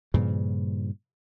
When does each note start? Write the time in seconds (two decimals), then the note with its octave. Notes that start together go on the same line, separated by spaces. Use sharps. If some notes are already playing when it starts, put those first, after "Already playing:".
0.14 G2 A#2 C#3 F3